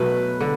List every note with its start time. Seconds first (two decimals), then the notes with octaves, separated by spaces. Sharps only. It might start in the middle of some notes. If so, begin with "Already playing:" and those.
Already playing: B2 F#3 A3 B4
0.41 D3